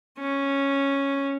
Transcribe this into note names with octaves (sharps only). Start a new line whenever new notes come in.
C#4